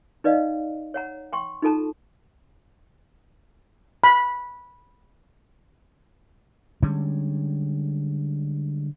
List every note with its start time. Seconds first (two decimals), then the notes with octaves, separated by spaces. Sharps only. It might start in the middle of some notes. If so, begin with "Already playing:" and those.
0.24 D#4 B4 D5 D#5 F5
0.94 C#5 F#5 A#5
1.33 G5 C6 C#6
1.62 D#4 F4 A4 A5 A#5
4.04 B5
6.83 D3 G3 G#3 C#4